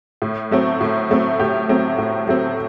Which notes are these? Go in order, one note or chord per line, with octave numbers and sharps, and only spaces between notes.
A2
F#3 A3 C4
A2
F#3 A3 C4
A2 G4
F#3 A3 C4
A2
F#3 A3 C4